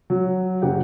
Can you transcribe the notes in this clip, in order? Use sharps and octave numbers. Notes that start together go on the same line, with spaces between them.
F#3
F#1 F#3 G4 F#5 G5